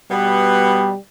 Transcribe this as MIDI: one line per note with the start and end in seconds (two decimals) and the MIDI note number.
0.11 0.93 47
0.11 0.96 55
0.11 0.93 59